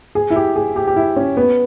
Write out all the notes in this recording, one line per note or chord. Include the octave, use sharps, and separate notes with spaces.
G#4
E4
G4
G#4
G4
G4
E4
C#4
B3